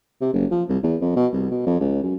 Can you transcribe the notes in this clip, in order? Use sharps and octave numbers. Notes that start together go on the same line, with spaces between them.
C3
F#1
F3
C2
E2
F2
B2
C2
B2
F2
C#2
F#2